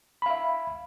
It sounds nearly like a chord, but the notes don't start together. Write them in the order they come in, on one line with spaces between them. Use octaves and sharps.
B5 F5 E5